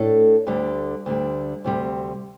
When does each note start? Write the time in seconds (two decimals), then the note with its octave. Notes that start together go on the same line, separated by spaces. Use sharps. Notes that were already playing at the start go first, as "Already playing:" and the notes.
Already playing: A2 A3 D4 A4
0.47 D2 D3 G3
1.06 D2 D3 G3
1.64 D2 C3 G3